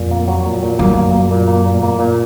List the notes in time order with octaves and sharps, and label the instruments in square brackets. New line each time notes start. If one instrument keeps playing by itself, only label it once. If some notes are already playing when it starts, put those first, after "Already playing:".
Already playing: [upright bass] F2 [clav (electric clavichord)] A#2
[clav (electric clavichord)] A#3
F#3
A#2
A#2
[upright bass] F#2 [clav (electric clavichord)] A#3
[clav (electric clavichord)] A#3
A#3
A#2
A#3
A#2
A#3
A#2